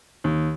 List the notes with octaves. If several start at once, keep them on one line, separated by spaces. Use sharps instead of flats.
D#2